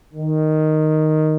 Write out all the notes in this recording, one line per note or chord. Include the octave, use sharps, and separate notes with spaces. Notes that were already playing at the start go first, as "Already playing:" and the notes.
D#3